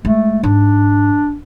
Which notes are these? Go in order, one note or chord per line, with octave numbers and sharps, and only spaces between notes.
G#3 A3
G#2 D4